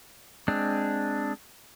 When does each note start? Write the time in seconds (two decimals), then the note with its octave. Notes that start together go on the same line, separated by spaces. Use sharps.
0.48 G#3 C4 D4